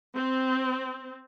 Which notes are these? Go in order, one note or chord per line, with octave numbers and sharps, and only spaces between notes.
C4